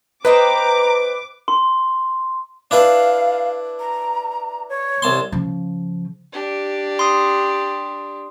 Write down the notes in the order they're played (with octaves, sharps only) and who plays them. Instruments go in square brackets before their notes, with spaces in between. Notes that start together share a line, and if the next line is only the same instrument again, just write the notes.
[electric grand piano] B4 [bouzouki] C5 D#5 G5 [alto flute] A#5 [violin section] D6
[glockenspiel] C6
[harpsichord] D4 E4 B4 [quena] F5
[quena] A#5
C#5
[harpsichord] C2 A5 C6
[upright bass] C#3 F3
[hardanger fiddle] D4 G4
[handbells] C6 D#6